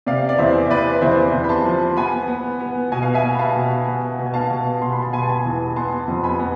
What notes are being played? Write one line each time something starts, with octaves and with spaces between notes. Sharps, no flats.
C3 D5 F5
D5
E2 C5 E5
E2 B4 D5
E2 C5 E5
E2
B5
A5 C6
F3
B3 G#5 B5
B3
B3
B2 G#5
F5
E5 G#5
B3
B5
F5 A5
B2
B3
B2
G#5
F5 A5
B2
B2 C6
B5
A5
B2 G#5 B5
A5
G#5 B5
E2
B3 A5 C6
F2
G#5 B5
B3